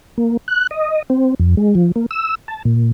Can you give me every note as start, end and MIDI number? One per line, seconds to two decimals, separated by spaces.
0.18 0.37 58
0.48 0.67 90
0.71 1.02 75
1.10 1.34 60
1.40 1.55 41
1.57 1.75 56
1.75 1.92 53
1.96 2.06 58
2.11 2.35 88
2.48 2.62 81
2.65 2.92 46